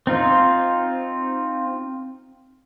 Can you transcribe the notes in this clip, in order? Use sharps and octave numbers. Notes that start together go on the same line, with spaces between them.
C4 D#4 F4